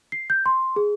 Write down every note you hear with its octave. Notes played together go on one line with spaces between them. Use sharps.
C7
G6
C6
G#4